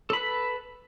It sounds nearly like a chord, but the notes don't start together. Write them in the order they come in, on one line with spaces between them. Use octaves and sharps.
A4 B5 B4